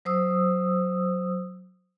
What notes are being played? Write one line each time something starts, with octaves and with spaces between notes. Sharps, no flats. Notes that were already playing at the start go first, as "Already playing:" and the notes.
F#3 C5 D#6 E6